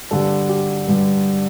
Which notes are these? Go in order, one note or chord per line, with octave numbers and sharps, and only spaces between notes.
G2 D3 G3 A4
G4
G2 D3 G3